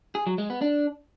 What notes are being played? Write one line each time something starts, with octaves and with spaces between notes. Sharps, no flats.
G#4
F#3
G#3
B3
D4